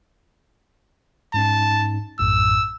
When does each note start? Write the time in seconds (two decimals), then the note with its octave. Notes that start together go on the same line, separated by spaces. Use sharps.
1.34 G#2 C#4 D#4 A5
2.19 A#1 F#2 A2 E6